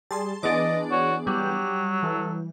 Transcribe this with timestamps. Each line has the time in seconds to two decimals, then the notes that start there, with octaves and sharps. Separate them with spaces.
0.11 G3 G#4 A5 C6
0.43 E3 B3 D4 G#4 D5 D#5
0.91 F#4 C#5
1.27 F#3 G3 G4
2.03 E3 A4